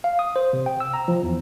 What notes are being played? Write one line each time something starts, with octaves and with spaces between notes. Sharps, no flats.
F5
D#6
C5
C3
G5
E6
A#5
F3
E2